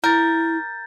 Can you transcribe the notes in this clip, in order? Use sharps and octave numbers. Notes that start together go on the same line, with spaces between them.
E4 A#4 G6 A6